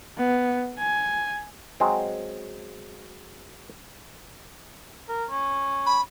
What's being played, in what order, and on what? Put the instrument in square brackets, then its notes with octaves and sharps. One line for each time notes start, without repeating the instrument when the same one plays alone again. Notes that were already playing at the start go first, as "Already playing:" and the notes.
[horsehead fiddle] B3
G#5
[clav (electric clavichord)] F#3 G#3 C4
[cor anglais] A#4
C#4
[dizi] B5